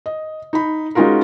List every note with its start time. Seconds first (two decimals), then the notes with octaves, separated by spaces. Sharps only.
0.06 D#5
0.53 D#4 B5
0.95 G#3 C#4 D#4 F4 F#4 A#4